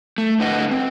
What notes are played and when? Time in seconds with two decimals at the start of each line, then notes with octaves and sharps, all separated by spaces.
0.18 A3
0.39 G#2 D3 B4 D#5 F#5
0.71 C4